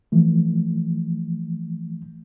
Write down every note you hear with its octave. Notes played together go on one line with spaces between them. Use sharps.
E3 F3 A3